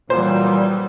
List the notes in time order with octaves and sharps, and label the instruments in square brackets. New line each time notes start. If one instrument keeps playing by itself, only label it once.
[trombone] A#2 [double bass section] E3 F#3 G3 [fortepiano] C5